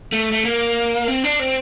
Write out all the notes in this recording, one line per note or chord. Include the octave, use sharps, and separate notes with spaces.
A3
A3
A#3
C4
D4
C4